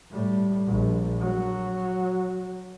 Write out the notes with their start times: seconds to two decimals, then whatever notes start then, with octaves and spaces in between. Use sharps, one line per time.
0.11 A2 G3
0.67 A#1
1.20 F#3